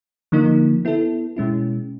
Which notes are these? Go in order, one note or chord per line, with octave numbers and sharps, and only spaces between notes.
D3 F3 A#3 D#4
B3 E4 A4
B2 G#3 C#4 E4